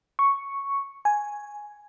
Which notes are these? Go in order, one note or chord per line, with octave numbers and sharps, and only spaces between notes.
C#6
G#5